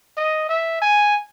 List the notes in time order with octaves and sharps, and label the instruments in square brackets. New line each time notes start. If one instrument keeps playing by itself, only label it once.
[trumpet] D#5
E5
G#5